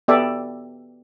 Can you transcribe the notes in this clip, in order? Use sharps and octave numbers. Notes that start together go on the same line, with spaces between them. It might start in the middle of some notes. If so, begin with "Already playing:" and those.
B3 G4 A4 D5 E5